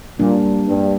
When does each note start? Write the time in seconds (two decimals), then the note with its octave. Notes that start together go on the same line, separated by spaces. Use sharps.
0.19 A#2 G3 A#3 D4
0.68 G2